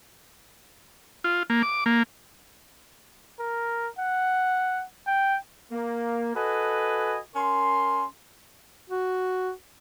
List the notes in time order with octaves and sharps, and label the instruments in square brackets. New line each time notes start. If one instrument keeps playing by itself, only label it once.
[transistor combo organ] F4
A#3
D6
A#3
[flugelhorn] A#4
F#5
G5
[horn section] A#3
F#4 A4 B4 D#5 G#5
C#4 A#4 C6
[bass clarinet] F#4